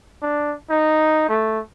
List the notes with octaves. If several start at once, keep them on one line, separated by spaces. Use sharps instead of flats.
D4
D#4
A3